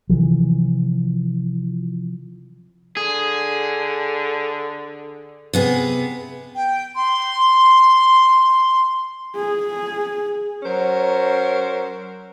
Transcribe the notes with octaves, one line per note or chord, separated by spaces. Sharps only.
C3 E3 F3
D3 G#4
C3 B3 G#4
G5
C6
G#4
F#3 C#4 A#4 C5